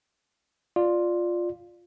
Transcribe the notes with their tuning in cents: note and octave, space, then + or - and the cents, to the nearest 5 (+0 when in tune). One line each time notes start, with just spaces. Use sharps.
F4 +5 D5 +10